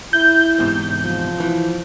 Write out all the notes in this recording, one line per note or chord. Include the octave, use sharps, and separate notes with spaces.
E4 G6
E2 G#2 C3
F3
E3